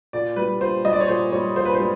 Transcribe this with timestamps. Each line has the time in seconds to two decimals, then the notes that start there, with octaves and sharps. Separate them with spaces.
0.13 A#2 D5
0.36 G3 B4
0.60 A#2 C5
0.85 G3 D#5
0.93 D5
1.00 C#5
1.08 A#2 C5
1.32 G3 C#5
1.56 A#2 C5
1.65 B4
1.74 C5
1.80 G3